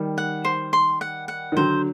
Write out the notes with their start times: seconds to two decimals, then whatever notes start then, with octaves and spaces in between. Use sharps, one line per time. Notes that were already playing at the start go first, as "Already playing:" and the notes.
Already playing: D#3 G3
0.18 F#5
0.45 C5
0.73 C6
1.01 F#5
1.28 F#5
1.52 D#3
1.57 D3 F#3 C5